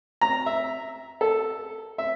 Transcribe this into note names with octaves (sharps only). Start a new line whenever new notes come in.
A#5
E5
A4
E5